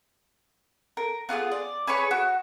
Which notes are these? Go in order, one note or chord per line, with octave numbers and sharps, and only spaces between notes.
A#4
B3 F4 F#4 G#4
D5
G#4 B4 C#5 C#6
F#4